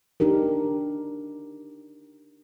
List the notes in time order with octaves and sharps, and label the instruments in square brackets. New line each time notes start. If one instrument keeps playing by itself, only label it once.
[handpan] D4 D#4 G4 A#4